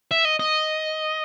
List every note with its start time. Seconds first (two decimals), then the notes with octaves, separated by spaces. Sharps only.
0.11 E5
0.25 D#5
0.40 D#5